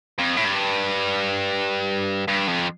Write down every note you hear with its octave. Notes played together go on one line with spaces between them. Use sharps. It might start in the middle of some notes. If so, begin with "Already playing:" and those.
F2
A2
G2
G2
F2